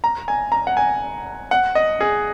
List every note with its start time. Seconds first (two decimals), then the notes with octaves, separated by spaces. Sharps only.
0.04 A#5
0.28 G#5
0.52 A#5
0.67 F#5
0.77 G#5
1.51 F#5
1.75 D#5
2.01 G#4